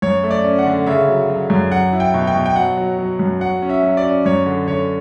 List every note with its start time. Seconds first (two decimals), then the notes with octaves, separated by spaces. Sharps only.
0.02 F#2 C#5
0.24 A3
0.31 D5
0.44 C#4
0.59 F#5
0.65 D3
0.86 C#3 E5
1.08 F#3
1.30 F#3
1.50 F#2
1.71 F#3 F#5
1.93 E4
2.00 G5
2.14 B2
2.27 G5
2.35 B2
2.46 G5
2.56 F#3 F#5
2.78 F#3
2.99 F#3
3.19 F#2
3.41 F#3 F#5
3.62 C#4
3.69 E5
3.83 F#3
3.97 D5
4.04 C#4
4.25 F#2 C#5
4.46 D3
4.68 D3 C#5